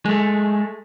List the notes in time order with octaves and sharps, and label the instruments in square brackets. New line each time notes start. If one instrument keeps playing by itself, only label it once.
[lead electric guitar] G#3 A3